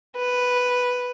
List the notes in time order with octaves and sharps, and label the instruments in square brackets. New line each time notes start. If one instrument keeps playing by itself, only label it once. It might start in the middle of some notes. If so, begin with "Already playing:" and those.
[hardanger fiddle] B4